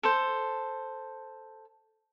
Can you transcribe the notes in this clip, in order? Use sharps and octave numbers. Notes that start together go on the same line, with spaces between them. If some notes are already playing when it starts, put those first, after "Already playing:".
A4 C5